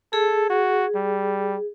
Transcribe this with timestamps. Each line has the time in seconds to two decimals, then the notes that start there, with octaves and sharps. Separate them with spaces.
0.13 G#4 A4
0.50 F#4
0.95 G3